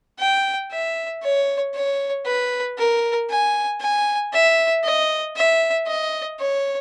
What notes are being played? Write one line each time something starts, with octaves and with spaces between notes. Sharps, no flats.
G5
E5
C#5
C#5
B4
A#4
G#5
G#5
E5
D#5
E5
D#5
C#5